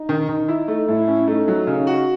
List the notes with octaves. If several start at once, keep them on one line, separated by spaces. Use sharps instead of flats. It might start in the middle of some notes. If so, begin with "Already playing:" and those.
Already playing: D#4
D#3
D#3
E4
A3
A2 E4
C#4
A3 D#4
F#3
C#3 D#4
F#4